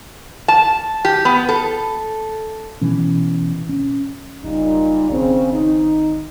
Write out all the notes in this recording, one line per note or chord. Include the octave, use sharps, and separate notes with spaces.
A5
G4
B3
A4
B2 E3 C#4
C#4
F#1 A#2 G3 D#4
G#1 C#3 C4
D#4